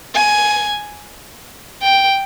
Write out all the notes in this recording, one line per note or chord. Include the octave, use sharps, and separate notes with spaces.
G#5
G5